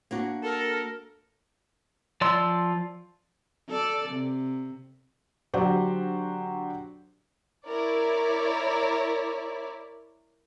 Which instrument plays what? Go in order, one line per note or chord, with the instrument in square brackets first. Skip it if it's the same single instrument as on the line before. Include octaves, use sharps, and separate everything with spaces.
[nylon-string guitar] A#3 D4 F#4
[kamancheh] A4 [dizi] A#4
[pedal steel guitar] F3 D5 C6 E6
[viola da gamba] A4 D5
C3
[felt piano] D3 F#3 F#4 G4 C5 D5
[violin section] E4 A#4 C#5 D5